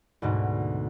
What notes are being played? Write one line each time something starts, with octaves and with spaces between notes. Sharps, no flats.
D2 G#2 B2